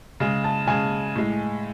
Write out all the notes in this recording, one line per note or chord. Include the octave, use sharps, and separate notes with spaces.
C#3 G#3
A5
C#3 G#3 G#5
A2 G#3